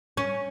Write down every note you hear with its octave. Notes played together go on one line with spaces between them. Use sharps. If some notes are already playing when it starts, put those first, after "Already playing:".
C#4